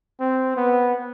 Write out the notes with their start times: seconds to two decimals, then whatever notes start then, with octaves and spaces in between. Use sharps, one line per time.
0.20 C4
0.56 B3